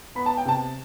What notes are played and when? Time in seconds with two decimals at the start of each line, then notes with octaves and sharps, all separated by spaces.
0.15 B3 B5
0.26 A5
0.37 G5
0.45 C3 A5